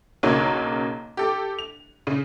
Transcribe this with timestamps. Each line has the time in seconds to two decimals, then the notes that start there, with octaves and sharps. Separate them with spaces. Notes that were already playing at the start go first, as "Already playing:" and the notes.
0.23 B1 C#3 F#3 A#3 C#5 G#6
1.17 G4 A4
1.59 F7
2.07 C#3